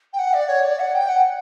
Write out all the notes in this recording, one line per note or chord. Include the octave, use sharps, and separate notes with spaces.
G5
F#5
D5
C#5
D5
F#5
G5
F#5